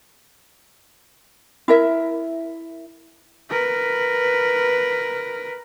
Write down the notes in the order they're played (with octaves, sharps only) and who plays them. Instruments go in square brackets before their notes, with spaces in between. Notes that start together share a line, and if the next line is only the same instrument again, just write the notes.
[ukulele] E4 A#4 E5
[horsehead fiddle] A#4 B4